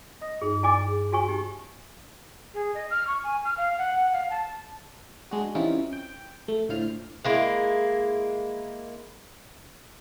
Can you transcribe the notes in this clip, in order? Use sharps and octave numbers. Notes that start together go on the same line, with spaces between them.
D#5 D#6 A#6
G2 D#4 G#4
E4 D5 G#5 D6 A6
G#4
F#4 C#5 G#5 C#6
D#4 G4
G#4
D#5
F6
C#6
G#5
F6
F5
F#5
F5
A5
G#3 D4 F#4
E3 G3 C4 C#4 D#4 F4
G5
A3
A2 D3 E4 F4 C5 F6
G#3 A#3 E4